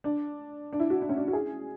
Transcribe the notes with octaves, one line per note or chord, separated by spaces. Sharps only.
D4
D4
E4
F#4
D4
C#4
D4
F#4
G#4